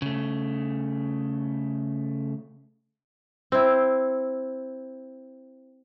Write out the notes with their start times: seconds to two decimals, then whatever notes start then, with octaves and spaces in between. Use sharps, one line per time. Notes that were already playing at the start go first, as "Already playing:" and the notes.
0.02 C#3 A3
3.52 C4 E4